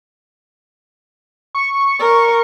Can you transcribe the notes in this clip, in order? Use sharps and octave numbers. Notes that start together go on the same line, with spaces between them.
C#6
A#4